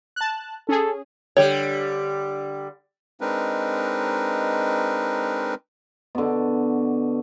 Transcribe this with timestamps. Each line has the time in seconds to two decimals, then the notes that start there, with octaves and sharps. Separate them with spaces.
0.16 A5 F#6
0.69 C#4 G#4 A4
1.37 D3 G3 G4 C#5
3.21 G#3 C4 D4 D#4 A#4 B4
6.15 B2 D3